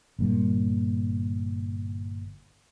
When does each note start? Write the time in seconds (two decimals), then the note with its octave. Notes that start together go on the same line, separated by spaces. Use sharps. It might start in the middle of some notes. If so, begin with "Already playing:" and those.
0.19 G1 A#2 G3